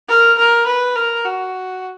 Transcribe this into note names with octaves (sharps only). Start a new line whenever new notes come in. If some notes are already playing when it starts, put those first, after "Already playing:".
A#4
A#4
B4
A#4
F#4